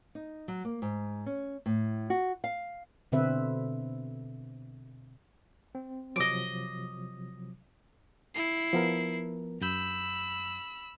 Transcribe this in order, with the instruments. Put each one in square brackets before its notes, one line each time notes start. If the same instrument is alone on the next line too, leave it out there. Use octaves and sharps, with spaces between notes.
[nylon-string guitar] D#4
F#3
A#3
G#2
C#4
A2
F#4
F5
[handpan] B2 D3 C4 B4 E5
[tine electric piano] C4
[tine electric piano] C3 F3 F#3 [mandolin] D#5 D6
[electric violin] E4 C7
[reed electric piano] F3 B3 A#4
[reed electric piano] F#2 G6 [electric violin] B5 E6